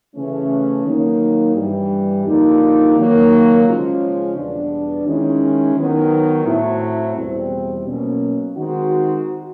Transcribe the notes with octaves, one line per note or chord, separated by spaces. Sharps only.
C#3 E3 A3 C#4
D#3 F#3 A#3 D#4
G2 E3 G3
F2 D3 G3 A#3 D#4
D#3 F#3 A#3
C#3 F3 G#3 C#4 F4
E2 B2 G3 B3 D4
D#3 G#3 C#4 E4
D#3 F#3 B3 D#4
A2 F#3 A3 C4 E4
E2 B2 G3 C4
B2 F#3 A#3 C#4
D#3 G#3 C4 D#4 F#4